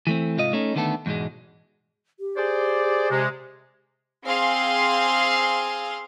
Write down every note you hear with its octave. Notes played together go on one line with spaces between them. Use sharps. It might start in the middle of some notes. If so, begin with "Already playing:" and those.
E3 A3 C4
G#2 C3 F4 D#5
A3 C#4 D#4
D3 D#3 A3 B3 A4
E2 G#2 B2 G#3
G4
G#4 C5 D5
C3 G#3
C4 G#4 F5 C6